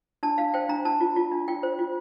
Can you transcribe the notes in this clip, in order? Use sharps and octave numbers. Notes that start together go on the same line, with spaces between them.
D4 A5
D4 F5
C5 G5
D4 A#5
D4 A5
F4
F4
D4
F4 G5
C5
F4